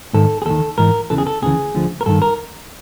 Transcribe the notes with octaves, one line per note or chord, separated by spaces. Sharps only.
G#2 D#3 A4
G#4
D#2 D#3 A4
G#2 E3 A#4
E2 C#3 E3 A4
G#4
A4
D2 C#3 E3 G#4
D2 D3 F3
A#4
G2 D#3 A4
A#4